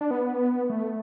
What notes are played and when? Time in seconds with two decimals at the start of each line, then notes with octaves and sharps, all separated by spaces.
0.01 D4
0.11 B3
0.70 A3